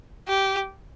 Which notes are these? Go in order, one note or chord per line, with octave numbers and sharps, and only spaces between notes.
G4